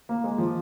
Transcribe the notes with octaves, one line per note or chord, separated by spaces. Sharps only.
A#3
G#3
F3